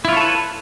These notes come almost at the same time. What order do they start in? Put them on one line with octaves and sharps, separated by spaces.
E4 F4 C#5 A4 B4